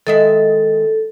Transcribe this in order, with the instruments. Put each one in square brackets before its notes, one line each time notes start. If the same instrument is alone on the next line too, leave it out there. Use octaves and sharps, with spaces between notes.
[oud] D#3 G#3 E5 [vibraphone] A4